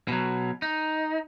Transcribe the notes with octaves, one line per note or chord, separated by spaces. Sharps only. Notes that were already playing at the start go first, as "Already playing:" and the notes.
B2 F#3
D#4